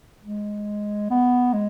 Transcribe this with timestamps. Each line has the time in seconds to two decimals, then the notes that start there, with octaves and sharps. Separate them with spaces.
0.24 G#3
1.10 B3
1.53 G#3